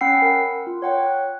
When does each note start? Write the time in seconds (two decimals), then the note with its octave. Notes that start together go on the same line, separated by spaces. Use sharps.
0.01 C#4 F#5 G5 B5 E6 C7
0.22 A#4 F#5
0.67 F4
0.82 C#5 F#5 G5
1.07 F#6